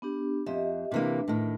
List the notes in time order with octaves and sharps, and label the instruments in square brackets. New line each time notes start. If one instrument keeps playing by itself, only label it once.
[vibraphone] B3 D4 G4
[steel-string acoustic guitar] F2 [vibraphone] G4 D#5 E5
[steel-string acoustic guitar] C3 E3 A#3 [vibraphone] D4
[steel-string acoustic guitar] A2 D#3